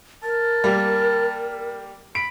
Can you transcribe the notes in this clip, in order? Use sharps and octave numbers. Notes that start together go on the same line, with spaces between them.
A#4 A5
G3 A#3 G4
B5 D7